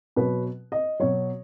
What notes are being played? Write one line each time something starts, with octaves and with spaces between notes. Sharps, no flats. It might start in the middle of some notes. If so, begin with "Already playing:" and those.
B2 F#3 B4
D#5
B2 F#3 C#5